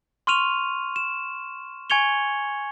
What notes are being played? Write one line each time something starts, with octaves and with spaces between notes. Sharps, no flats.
C6 C#6 F6 D#7 F7
E7
G#5 C#6 G#6 C#7 F7 G7